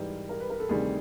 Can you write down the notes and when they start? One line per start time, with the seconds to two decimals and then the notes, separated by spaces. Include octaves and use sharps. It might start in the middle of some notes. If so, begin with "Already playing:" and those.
Already playing: G#2 E3 G3 A#4
0.29 A#4
0.40 B4
0.50 A#4
0.60 A4
0.69 D2 C3 D#3 G3 G#4